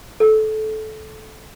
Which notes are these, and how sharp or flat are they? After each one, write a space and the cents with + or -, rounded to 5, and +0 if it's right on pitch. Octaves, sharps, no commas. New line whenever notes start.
A4 -20